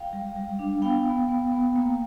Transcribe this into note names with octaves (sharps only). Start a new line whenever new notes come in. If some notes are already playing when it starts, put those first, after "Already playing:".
Already playing: F5 G5
G3
G3
D4
B3 F5 G5
B3
B3
B3
A#3